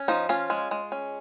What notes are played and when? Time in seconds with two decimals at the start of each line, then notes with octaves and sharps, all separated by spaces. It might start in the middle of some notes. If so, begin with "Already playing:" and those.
Already playing: C#4
0.08 F3 D#4
0.29 C#4 F4
0.50 G#3
0.71 G#3
0.92 C#4